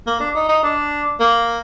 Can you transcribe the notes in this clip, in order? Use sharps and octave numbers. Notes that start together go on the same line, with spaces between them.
A#3
D4
D#4
D#4
D4
A#3